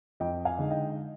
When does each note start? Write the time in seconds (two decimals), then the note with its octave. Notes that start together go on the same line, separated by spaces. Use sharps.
0.20 F2 D#5 G5
0.45 F5 G#5
0.58 D3 G#3 D#4
0.70 D#5 G5